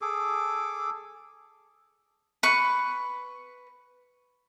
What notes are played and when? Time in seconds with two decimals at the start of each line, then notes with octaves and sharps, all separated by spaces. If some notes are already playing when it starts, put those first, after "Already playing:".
0.01 G#4 A4 D6
2.43 B4 C#6